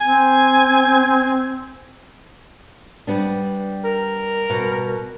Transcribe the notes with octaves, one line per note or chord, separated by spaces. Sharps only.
C4 G#5
G3 B3 D4
A#4
B2 G3